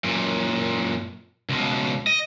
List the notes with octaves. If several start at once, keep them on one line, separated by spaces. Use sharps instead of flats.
F#2 A#2
C#2 B2
D#5